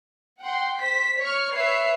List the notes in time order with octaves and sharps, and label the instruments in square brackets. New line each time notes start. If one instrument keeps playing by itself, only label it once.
[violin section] F#5 G5 C6
C5 B6
C#5 C#6 F6
B4 C#5 E5 C7